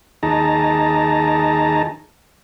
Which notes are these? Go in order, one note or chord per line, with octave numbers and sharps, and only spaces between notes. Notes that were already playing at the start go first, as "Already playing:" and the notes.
D#2 D#4 G#4 A5 A#5